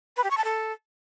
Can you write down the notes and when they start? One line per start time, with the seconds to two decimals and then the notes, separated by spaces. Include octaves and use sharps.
0.17 B4
0.24 G4
0.31 C#6
0.37 A5
0.44 A4